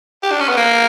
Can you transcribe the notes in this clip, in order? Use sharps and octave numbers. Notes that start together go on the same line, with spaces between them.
G4
D4
C#4
B3
A#3